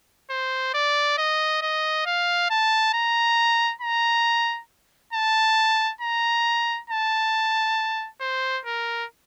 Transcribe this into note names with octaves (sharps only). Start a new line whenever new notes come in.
C5
D5
D#5
D#5
F5
A5
A#5
A#5
A5
A#5
A5
C5
A#4